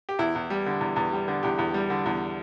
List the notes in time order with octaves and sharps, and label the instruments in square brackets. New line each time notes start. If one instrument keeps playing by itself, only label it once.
[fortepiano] G4
E2 E4
E2
G3
D3
E2
E2
G3
D3
E2 G4
E2
G3
D3
E2